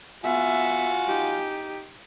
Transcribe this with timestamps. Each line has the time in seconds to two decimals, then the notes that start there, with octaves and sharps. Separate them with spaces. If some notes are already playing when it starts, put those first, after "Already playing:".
0.24 B3 F4 F#4 E5 G#5
1.07 D#4 G4